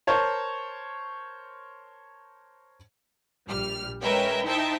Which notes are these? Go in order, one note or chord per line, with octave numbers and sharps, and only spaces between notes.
A#4 C5 C#5 A5
A#1 G3 F6
G#3 C#4 A#4 B4 E5 G5
D#4 E4 C5 E5 G5 A5